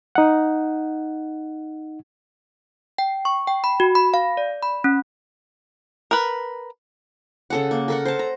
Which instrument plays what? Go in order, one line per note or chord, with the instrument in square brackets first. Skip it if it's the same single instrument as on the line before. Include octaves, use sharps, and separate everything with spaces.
[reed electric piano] D#4 F#5
[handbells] G5
C#6
G5
B5
F#4
B5
F5
D5
B5
C#4
[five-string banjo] A#4 B4
[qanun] C#3 A4 F#5
A#3
A4 A#4 F#5
C5 A5
A#5